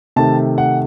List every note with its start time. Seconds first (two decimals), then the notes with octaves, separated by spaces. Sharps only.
0.16 C3 D#3 A3 A5
0.58 F#5